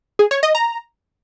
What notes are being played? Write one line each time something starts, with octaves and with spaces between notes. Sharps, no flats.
G#4
C#5
D#5
A#5